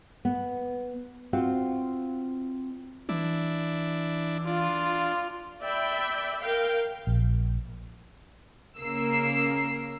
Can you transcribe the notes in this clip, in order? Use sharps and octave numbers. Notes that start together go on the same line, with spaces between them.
B3
C4 F4 F#4 C5 F5
E3 D4 E4
D4 F4
D5 E5 G5 B5
A#4 F5 G5
A#1
C#3 A#3 A#4 E6 C7